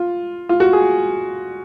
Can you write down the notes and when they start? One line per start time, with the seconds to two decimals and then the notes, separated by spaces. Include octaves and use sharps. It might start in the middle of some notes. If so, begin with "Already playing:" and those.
Already playing: F4
0.49 F4
0.60 F#4
0.73 G#4